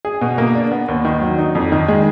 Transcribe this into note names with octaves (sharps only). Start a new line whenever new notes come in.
G#4
B2
A#3
D4
B3
D#2
D#3
F#3
D#4
F2
D#3
G#3